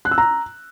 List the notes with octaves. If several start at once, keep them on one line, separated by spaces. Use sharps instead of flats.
F#6
E6
A#5